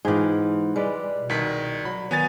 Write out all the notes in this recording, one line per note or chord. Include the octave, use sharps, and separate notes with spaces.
G#2 E3 F4 G4 G#4
G3 G#3 B4 D5
B2
C2 D#3 B6
F#3 B5
D#3 F#3 B3 G#5 A6